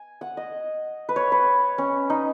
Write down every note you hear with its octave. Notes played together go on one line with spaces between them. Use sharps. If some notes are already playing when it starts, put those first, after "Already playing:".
Already playing: G#5
F#5
D#5
B4
C#5
B4
C#4
D#4